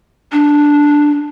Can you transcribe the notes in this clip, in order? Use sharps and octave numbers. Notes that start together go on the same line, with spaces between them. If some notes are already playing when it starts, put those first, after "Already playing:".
D4